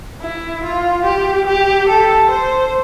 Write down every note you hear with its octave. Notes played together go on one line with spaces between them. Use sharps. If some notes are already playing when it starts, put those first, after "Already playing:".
E4
F4
G4
G4
A4
C5